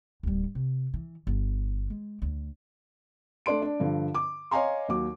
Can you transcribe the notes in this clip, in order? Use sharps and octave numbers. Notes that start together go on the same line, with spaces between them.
D1 G3
C3
E3
G1
G#3
D2
A3 D4 D5 C6 D7
D4
G2 D3 F3
D6
C#5 D#5 F5 G#5 A#5 C6
D#2 F#3 D6